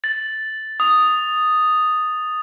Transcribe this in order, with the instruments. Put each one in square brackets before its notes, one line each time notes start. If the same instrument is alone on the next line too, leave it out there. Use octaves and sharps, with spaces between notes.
[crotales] A6
D#6